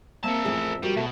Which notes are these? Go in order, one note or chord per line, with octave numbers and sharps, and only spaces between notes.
A#3 C4 A#4 E5 A5
A1 F2 A3 G#4
G3 F#4 G4 A#4
B2 A3